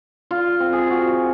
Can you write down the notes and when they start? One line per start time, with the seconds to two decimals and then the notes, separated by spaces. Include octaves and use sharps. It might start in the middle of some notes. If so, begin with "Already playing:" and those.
0.31 F4
0.60 C4
0.73 G#4
0.90 F#4